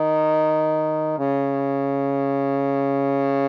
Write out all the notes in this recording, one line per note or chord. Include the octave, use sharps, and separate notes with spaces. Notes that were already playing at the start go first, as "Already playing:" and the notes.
Already playing: D#3
C#3